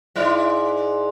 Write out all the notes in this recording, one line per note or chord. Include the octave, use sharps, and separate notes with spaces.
G#2 E4 D5